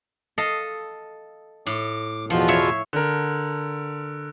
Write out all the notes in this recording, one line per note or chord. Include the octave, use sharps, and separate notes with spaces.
A4 D#5 F5
A2 D6
E2 B2 F3 F4
C#5 E5 F5
D3 A#4